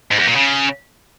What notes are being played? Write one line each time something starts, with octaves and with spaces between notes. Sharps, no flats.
G#2
E2
A#2
C#3